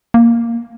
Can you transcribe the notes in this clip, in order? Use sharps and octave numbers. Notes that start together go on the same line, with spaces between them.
A#3